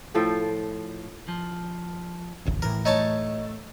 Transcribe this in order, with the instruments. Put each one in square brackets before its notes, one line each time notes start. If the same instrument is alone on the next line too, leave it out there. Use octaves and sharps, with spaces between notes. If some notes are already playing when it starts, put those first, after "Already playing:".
[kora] A2 F3 A4 G5
[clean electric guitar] F3
[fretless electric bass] E1 A1 D2
[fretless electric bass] A2 E3 [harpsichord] A#4
[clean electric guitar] A3 [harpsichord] D#4 C#5 A5